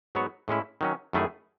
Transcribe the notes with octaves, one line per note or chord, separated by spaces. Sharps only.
G#2 F#3 B3 F#4 C#5
A2 G#3 C#4 E4
D#3 F#3 C#4
F#2 D#3 A3 E4 G#4